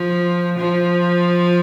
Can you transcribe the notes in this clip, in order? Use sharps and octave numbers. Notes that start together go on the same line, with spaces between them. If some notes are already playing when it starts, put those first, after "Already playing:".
Already playing: F3
F3